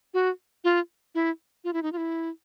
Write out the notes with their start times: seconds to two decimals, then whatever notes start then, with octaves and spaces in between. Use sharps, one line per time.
0.14 F#4
0.64 F4
1.15 E4
1.64 F4
1.73 E4
1.83 D#4
1.92 F4
1.97 E4